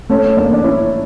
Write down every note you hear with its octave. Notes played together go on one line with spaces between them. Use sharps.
A3 C#4
A#3 D4
D4
C#4 E4